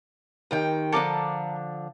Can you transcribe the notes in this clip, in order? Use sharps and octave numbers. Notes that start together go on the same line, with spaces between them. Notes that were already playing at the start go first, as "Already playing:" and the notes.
D#2 D#3 G5
D3 F3 D4 A4 A#4 D6